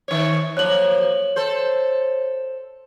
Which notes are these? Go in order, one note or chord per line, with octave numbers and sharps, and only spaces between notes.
D#3 C#5
F3 F#3 A#3 C#5 F#7
A4 C5